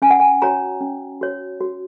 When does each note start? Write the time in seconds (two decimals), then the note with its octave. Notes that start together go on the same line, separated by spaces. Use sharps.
0.02 C#4 G#5
0.10 F#5
0.20 G#5
0.42 F#4 C#5 A#5
0.81 C#4
1.21 F#4 C#5
1.60 F#4